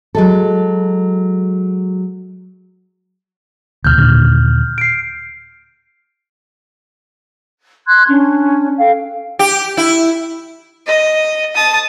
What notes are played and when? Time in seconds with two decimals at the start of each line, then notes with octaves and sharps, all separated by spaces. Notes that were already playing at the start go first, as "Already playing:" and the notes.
0.15 F#3 G#3 A4
3.85 D2 B2 F6 G6
3.97 D#2 A#2 D3
4.78 C7 D7
7.86 C6 F#6 G#6
8.08 C#4 D4
8.78 A4 F5 G5
9.39 G4
9.77 E4
10.87 D#5
11.55 A5 D#6